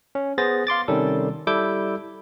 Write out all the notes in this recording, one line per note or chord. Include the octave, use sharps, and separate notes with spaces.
C#4
B3 G#4 C5 A6 A#6
F5 C6 D6 A6
C3 D#3 G3 C#4 A4
G3 E4 A4 D6 E6 G6